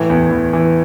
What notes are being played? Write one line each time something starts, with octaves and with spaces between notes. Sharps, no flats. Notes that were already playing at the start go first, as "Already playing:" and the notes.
Already playing: A2 E3
E2
E2
E3